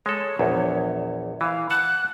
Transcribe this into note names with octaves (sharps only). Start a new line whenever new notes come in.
G#3 A4 C#5
A#1 E2
E3 F5
F#5 A5 F#6